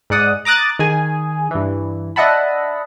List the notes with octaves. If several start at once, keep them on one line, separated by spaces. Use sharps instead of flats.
G#2 D5 F#5 D#6
A#5 D6 D#6 F#6 A6
D#3 G#4 G#5
G2 E3
D4 D#5 E5 F#5 A5 B5